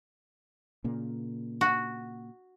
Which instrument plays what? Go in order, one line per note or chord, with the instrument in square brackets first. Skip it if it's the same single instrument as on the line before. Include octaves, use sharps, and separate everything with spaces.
[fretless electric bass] A#2 C#3 A#3
[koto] F#4